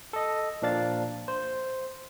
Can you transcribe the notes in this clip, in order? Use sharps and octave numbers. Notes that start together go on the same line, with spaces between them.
A4 D#5
A#2 F3 D4 F5 A6
C5